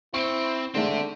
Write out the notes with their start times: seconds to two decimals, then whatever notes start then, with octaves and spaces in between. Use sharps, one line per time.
0.14 C4 E4 C#6
0.75 D3 D#3 G#3 A3 C4 E5